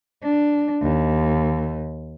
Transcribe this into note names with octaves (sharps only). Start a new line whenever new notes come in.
D4
D#2